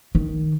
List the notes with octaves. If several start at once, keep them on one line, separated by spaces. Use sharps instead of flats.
D#3